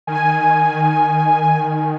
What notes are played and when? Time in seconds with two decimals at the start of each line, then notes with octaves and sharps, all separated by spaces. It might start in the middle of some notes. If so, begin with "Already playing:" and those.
0.07 D#3 G#5